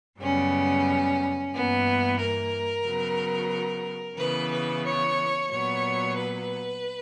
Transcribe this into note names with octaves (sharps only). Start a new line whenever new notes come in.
F#2 C#3 G3 B3 C#4
G2 E3 A#3 B3
A#4
C#3 F#3 B3
C#3 E3 B3 B4
B4
C#5
A#2 F#3 B3 C#5
B4